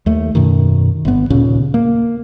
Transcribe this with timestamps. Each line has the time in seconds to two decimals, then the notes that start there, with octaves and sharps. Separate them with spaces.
0.06 D#2 A3
0.35 F#2 B2 D#3
1.05 G1 B3
1.30 D#2 A#2 C#3 C#4
1.74 A#3